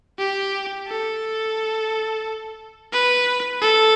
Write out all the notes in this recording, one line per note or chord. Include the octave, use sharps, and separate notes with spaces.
G4
A4
B4
A4